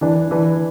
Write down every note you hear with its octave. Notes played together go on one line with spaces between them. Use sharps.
E3 D4 B4
E3 D4 B4